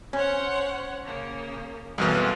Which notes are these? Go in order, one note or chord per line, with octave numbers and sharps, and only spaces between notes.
C#4 C5 C#5 F#5
C#3 A#3
C2 F#2 B2 E3 G#3 A4 F5